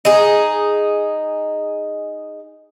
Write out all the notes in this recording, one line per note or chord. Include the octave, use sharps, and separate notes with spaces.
D#4 G#4